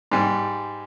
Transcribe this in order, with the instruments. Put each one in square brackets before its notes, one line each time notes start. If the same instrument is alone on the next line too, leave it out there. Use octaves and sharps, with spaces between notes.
[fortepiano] G#2 G3